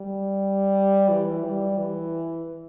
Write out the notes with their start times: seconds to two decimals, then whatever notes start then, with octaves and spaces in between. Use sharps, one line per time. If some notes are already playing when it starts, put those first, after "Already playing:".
Already playing: G3
1.10 E3
1.44 G3
1.78 E3